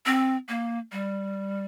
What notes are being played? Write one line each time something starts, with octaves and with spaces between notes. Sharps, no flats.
C4
A#3
G3